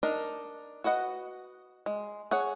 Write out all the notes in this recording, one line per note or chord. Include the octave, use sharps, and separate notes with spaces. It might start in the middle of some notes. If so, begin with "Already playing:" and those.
D4 D#4 A#4
F#4 B4 D#5 F#5
G#3
G#4 C#5 F#5